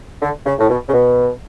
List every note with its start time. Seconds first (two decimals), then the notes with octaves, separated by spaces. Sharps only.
0.22 D3
0.46 C#3
0.59 A2
0.70 B2
0.88 C#3
0.93 B2